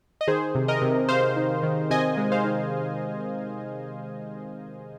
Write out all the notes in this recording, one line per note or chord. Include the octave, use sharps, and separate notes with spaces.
D#5
D#3 G#4 C5
C3
A#4 D#5
C3
C3 C5 F5
D#3
D#3
C3 D#5 G#5
G#3
C5 F5
D#3